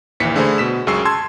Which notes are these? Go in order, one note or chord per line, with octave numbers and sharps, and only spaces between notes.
A#1 D#2 E3 B6 C#7
D3 A3 G#4 C5 B5
B2 B6 E7
C#2 F#2 G#4 C#6 E6 C7
A5 C6 E6 G#6